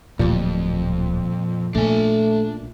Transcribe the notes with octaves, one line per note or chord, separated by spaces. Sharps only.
D1 F2 A#2 G3
A#1 A3 D4 G#5